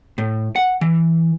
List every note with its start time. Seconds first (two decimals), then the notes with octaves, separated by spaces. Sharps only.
0.18 A2
0.56 F#5
0.81 E3